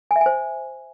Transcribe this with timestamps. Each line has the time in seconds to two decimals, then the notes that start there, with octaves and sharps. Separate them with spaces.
0.11 G#5
0.16 E5
0.21 G#5
0.26 C5